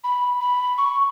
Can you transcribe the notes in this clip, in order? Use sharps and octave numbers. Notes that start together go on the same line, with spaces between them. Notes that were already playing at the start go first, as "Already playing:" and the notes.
B5
B5
C#6